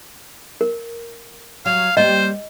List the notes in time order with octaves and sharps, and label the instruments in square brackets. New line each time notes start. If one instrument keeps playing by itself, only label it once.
[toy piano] A#4
[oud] F#3 [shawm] F5
[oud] G3 A#3 [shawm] C5 [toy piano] D#5